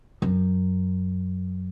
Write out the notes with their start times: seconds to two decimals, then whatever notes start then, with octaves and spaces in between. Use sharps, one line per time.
0.22 F#2